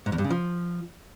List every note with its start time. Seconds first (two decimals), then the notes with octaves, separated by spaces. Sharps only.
0.06 G#2
0.12 E2
0.18 G2
0.24 C#3
0.31 F3